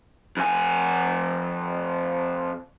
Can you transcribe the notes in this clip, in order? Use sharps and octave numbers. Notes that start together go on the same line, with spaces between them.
F2 G#5